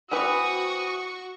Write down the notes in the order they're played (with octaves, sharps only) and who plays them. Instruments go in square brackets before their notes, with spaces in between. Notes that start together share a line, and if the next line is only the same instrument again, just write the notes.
[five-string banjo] E3 C4 B4 [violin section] F#4 C#6 [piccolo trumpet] D#6